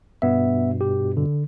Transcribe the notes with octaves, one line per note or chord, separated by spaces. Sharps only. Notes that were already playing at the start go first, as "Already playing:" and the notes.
G2 B2 B3 E5
G4
D3